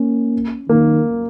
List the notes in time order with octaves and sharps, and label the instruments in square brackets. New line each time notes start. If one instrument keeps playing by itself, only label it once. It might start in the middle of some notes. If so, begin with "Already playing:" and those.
Already playing: [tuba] A#3 [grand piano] C#4
[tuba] D#3 [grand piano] A#3